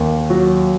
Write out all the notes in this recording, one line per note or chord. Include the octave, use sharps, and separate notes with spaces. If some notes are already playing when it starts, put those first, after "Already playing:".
Already playing: D#2
F#3